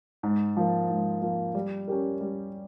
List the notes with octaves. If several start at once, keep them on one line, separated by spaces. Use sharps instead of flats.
G#2
F3 A#3
G#2
F3 A#3
G3
C#4 G4 A#4
G3